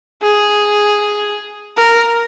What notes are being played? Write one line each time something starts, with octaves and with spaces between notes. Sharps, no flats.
G#4
A#4